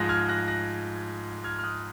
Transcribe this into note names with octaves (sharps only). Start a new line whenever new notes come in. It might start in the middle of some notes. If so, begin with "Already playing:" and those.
Already playing: G#2 F3 G#3 F#6 A#6
F6 G#6
F#6 A#6
F#6 A#6
F6 G#6
F6
D#6 F#6